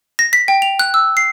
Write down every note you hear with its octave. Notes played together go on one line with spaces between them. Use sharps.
A#6
B6
G5
F7
F#6
E6
C7